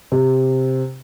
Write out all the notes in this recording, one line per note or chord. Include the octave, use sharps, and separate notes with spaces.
C3